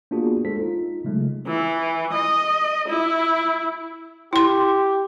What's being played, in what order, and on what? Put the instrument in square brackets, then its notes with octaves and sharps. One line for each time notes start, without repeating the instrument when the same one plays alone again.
[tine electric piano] A#3 B3 D4 F4 F#4 G#4
G#3 A4 C5 B6
D#4 F4
C#3 F#3 G#3 A3
[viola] E3
D#5
E4
[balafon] E4 C6 [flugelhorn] G4